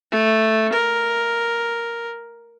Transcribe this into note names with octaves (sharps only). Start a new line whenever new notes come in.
A3
A#4